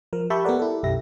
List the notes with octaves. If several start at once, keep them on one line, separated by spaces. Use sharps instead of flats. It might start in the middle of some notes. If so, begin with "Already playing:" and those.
F3 A#4
G4 E5 A5 B5 C#6 G6
B3 G4 A4 A#4 D5 F#5
E4 A4
B1 F#2 G4 E5 A#6